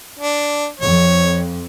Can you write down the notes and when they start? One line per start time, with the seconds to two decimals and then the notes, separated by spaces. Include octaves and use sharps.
0.20 D4
0.80 F2 C#5